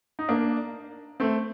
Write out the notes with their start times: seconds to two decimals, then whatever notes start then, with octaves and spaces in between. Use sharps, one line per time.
0.19 D#4
0.29 A#3 D4
1.20 A3 C4